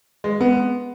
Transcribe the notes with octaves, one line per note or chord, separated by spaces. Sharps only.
G#3
B3